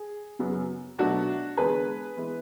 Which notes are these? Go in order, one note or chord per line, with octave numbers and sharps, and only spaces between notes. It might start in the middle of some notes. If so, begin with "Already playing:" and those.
Already playing: G#4
F#2 C#3 F#3 B3
B2 F#3 A3 D4 F#4
E2 D3 G#3 B3 G#4 B4
E3 G#3 B3